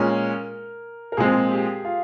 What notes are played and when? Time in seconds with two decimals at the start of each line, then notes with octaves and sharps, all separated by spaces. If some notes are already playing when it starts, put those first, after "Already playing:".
Already playing: A#2 G#3 C#4 A#4
1.12 A#4
1.17 A#2 F3 G#3 C4 G#4
1.51 G4
1.85 F4